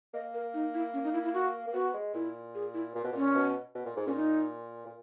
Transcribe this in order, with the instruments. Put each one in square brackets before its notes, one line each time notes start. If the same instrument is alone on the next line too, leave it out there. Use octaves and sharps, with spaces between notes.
[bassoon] A#3 [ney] D#5
[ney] A#4
D#4
E4
C#4
D#4
E4
E4
F#4
[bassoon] A#3
[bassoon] B3 [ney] F#4
[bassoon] G#3
[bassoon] A#2 [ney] E4
[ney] G#4
E4
[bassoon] A#2
B2
[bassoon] A#2 [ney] C#4
[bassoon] B2
B2
A#2
G#2
[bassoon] A#2 [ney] C#4
[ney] D#4
[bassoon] A#2